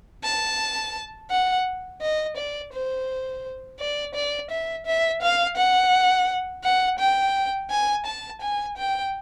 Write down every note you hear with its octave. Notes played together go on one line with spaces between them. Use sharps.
A5
F#5
D#5
D5
C5
D5
D5
E5
E5
F5
F#5
F#5
G5
G#5
A5
G#5
G5